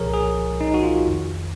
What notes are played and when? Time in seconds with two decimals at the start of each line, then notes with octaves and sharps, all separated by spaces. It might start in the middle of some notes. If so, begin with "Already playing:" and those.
Already playing: C2 A#2 F3 G#4 A#4 C#5
0.14 G#4
0.61 D#4
0.74 F#4
0.83 F4
1.07 F2 D#3